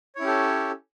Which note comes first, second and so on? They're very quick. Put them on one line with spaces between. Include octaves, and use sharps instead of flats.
C#5 E4 C#4 G4 A4